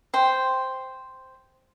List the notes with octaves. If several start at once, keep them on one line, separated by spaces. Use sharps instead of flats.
C5 G5